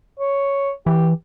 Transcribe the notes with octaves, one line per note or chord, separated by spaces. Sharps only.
C#5
E3 G4